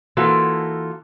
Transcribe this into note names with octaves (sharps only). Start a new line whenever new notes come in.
E3 A#3 F4 F#4 A4